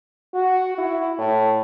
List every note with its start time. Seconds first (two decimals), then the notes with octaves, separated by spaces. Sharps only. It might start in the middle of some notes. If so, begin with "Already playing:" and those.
0.34 F#4
0.78 E4
1.18 A2